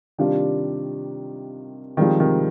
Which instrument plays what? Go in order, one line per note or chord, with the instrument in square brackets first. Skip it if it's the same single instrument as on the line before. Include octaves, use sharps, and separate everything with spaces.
[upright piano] C3 D#3 [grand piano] G3 D4 F4
[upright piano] D#3 G3 [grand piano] F3 G#3 C4
[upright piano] C3 D#3